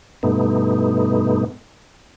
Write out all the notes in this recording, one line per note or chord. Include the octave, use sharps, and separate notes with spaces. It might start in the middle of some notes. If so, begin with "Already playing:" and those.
G2 B2 A3 B3 D#4